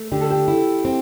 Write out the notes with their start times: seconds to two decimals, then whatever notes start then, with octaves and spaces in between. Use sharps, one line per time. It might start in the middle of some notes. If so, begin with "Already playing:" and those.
Already playing: A3
0.12 D3 G4
0.21 A4
0.31 G4
0.48 E4
0.85 C4